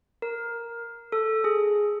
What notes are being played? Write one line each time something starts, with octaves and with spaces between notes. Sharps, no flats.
A#4
A4
G#4